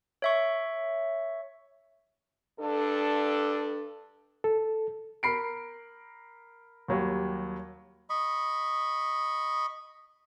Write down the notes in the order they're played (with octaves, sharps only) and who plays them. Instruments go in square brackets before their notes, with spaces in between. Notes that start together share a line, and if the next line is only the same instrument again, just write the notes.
[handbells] C#5 E5 C#6
[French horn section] G2 D4 A4
[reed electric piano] A4
[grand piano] A#4 B5 C7 D7
D#2 F#3 G3
[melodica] D#5 B5 C#6